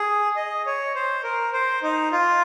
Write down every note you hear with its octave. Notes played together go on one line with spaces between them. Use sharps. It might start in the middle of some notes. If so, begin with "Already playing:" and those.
Already playing: G#4
D#5
C#5
C5
A#4
C5
D#4
F4